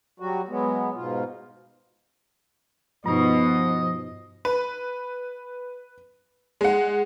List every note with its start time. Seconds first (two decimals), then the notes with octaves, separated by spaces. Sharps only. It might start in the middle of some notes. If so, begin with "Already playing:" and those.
0.20 F#3 G3 F#4
0.49 F#3 G#3 B3
0.95 G#2 B2 F4
3.06 G2 B2 F3 D#4 D#5
4.45 B4
6.61 G#3 F#5